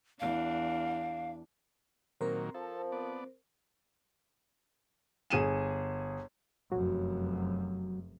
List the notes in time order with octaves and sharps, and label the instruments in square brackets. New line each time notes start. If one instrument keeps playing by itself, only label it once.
[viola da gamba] E2 D4 [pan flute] F5
[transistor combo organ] A#2 D#3 F#3 [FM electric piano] C4 A#4 C5
[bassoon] F3 [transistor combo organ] A4
[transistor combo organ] B3 D5
[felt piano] G1 G#4 D#7 E7
[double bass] F1 F#2 [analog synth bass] F#3